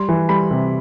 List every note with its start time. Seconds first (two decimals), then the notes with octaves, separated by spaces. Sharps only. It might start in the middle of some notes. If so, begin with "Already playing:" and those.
Already playing: G3 C6
0.09 E3
0.29 G3 B5
0.51 C3